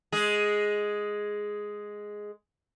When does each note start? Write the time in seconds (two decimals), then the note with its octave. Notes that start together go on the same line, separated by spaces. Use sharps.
0.12 G#3 G#4